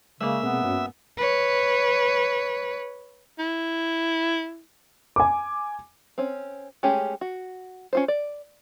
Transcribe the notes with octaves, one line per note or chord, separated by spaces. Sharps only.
C#3 G#3 A#3 E5
B2 B3 C4 G#4
G2 C#4 F#4
B4 C#5
E4
G#5 D6
C4 C#4
G#3 A3 C#4 G4 G#4
F#4
C#4 F4 C5
D5